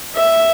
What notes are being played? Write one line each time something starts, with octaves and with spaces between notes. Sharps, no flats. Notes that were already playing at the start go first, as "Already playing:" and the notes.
E5